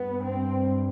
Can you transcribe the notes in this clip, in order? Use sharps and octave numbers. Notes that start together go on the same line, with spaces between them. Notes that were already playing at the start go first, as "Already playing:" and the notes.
Already playing: G2 B3
C4